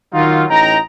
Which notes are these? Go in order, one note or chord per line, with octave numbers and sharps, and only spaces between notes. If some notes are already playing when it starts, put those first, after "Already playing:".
D#3 F#3 D#4 F4
A1 D#4 G5 A#5